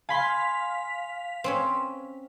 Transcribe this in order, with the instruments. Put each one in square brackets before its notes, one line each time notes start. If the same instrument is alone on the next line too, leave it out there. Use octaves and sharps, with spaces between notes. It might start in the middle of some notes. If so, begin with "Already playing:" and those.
[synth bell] F5 B6 [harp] G#5 B5 C6
[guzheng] C4 C#4 C#5